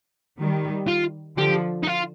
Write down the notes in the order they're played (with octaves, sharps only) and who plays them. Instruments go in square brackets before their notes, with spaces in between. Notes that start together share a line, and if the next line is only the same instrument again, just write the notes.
[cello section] D#3 G3
[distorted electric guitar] F4
[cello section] D3 F3 [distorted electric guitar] G4
[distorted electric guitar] D#4
F4